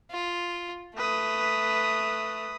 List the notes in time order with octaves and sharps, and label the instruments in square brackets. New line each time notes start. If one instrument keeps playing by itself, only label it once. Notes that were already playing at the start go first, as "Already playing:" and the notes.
[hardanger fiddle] F4
[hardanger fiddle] A3 [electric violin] B4 D#6